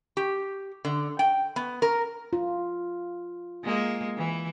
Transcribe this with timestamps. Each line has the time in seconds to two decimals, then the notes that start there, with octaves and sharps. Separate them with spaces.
0.17 G4
0.85 D3
1.19 G5
1.56 B3
1.82 A#4
2.33 F4
3.64 G#3 A#3
4.17 E3